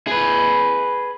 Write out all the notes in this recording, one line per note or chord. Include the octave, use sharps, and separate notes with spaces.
G#4 B4